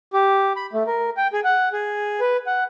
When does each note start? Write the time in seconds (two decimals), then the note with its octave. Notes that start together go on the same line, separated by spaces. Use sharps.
0.13 G4
0.56 B5
0.73 A3
0.87 A#4
1.17 G5
1.33 G#4
1.44 F#5
1.73 G#4
2.20 B4
2.46 F#5